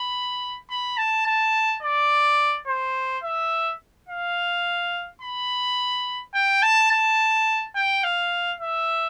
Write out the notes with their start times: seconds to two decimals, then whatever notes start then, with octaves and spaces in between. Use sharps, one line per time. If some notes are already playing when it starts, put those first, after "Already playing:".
Already playing: B5
0.70 B5
0.97 A5
1.26 A5
1.82 D5
2.67 C5
3.23 E5
4.09 F5
5.22 B5
6.34 G5
6.63 A5
6.91 A5
7.76 G5
8.04 F5
8.60 E5